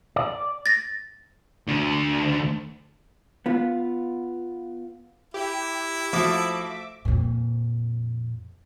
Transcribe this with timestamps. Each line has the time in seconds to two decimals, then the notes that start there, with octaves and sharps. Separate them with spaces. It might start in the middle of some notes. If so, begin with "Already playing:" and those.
0.16 D5
0.66 A6 A#6
1.67 D2 D3
3.46 B3 F4
5.34 E4 G4
6.13 F3 A3 F#4 E5 D6
7.05 F2 A#2